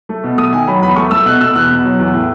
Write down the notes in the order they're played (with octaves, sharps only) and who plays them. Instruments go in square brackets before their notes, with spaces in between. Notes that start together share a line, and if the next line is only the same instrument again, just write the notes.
[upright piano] A3
B2
A3 D#6
D#3 G#5
F#3 B5
E2 B5
A3 C#6
A3 E6
B2 F#6
B2 E6
E2 F#6
B2
F#3
E2
A2